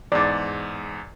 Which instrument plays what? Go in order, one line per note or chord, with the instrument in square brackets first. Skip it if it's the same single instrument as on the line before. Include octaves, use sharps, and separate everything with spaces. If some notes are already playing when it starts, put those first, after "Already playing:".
[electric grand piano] E2 G#2 [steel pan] D5